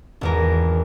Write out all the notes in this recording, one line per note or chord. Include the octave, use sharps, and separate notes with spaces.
G#1 E2 A#4